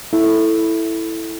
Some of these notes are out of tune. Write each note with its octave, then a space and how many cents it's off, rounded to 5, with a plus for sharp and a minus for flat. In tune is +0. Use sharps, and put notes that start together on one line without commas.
E4 +0 A4 +0